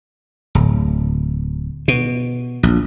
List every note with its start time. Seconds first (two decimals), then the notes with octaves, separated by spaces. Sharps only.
0.55 D1
1.88 B2
2.63 A#1